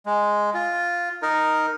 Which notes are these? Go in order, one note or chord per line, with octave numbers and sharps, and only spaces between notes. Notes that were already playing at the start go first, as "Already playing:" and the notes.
G#3
F4
D#4 A#4